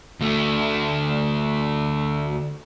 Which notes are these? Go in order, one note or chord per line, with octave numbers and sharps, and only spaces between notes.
D2 A3